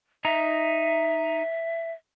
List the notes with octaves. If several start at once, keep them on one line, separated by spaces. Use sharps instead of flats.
D#4 E5 A#5